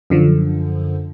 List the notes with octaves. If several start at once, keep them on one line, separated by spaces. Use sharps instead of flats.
F#2 D3 F3